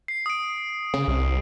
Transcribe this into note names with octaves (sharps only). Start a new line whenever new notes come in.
C7
D#6 D7
C#3
C2